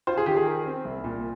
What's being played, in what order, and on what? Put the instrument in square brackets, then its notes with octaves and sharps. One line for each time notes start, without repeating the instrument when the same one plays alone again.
[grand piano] F4 [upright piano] C5
[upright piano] G#4
[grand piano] D#3 [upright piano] G4
[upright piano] G#4
[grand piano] A#4
C4
C2
A#2